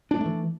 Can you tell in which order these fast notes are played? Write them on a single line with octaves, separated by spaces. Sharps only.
D4 G#3 A3 E3